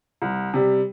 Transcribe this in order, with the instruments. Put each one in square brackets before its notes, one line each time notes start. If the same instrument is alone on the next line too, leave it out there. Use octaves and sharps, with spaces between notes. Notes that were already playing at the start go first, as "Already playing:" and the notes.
[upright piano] C2
C3 G3